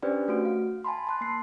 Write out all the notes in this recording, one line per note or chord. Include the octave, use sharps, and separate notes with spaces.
C#4 D4 G4 B4 C5 D5
A3 F#4 D7
F5
G#5 A5 B5 C6
A5 C6 F#6
A#3 C7